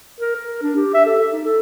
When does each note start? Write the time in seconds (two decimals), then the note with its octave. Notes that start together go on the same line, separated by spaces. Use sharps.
0.20 A#4
0.36 A#4
0.62 D4
0.76 G4
0.94 E5
1.06 A4
1.33 D#4
1.45 A4